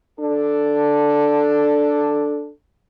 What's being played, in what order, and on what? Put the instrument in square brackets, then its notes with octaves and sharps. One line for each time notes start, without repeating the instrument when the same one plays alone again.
[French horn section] D4 A4